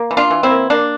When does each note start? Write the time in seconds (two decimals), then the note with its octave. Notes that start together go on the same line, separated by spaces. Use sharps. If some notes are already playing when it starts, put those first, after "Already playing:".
Already playing: A#3
0.11 E3
0.17 D4 F4
0.31 E3
0.43 C4 E4
0.50 A#3
0.70 A#3 D4